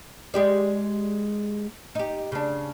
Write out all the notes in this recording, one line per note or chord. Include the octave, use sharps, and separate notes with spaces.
G#3 G4 D5
D#4 G4
C#3 D4